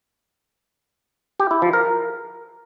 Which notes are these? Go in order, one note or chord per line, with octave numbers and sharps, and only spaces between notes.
G4
E4
F3
A#4